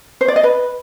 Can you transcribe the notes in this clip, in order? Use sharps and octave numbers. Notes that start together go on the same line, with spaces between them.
C5
D5
D#5
B4